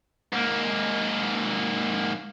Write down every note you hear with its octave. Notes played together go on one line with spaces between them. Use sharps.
G#2 A#3